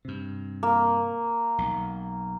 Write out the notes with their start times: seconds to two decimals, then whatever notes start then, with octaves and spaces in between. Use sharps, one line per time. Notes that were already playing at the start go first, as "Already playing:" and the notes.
0.05 G2 C3
0.63 A#3
1.58 B1